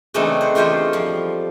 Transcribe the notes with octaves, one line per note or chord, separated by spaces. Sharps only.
C#3 E3 A3 C4 D4 D#4
C5 F#5
E2 A3 F4 G4 C5 D#5
F3 G3